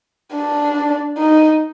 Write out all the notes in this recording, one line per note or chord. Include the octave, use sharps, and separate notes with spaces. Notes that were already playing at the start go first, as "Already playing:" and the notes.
D4
D#4